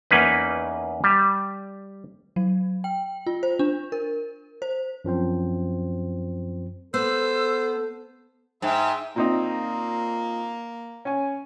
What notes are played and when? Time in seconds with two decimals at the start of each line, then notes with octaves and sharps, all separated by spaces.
0.11 E2 A#3 C#4 D#4 B4
1.04 G3
2.36 F#3
2.84 G5
3.27 F4
3.43 C5
3.59 D4
3.92 A#4
4.62 C5
5.05 F#2 F3 C4 C5
6.94 B3 A4 C5 E6
8.62 G#2 E5 G5
9.16 A#2 A#3 C4 D#4
11.05 C#4 G#5